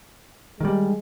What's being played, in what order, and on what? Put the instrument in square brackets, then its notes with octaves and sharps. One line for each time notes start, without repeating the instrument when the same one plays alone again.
[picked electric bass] D#3 G3 [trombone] G#3